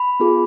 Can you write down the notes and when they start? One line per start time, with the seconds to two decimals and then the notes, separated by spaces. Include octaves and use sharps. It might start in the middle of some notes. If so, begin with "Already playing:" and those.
Already playing: B5
0.20 B3 F4 G#4